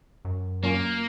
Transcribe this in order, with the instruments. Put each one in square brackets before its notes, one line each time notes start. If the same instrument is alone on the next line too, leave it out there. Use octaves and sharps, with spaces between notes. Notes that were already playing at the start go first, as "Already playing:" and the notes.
[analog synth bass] F#2
[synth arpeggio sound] F#3 C#4 F4 [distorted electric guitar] A#3 [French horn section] A#4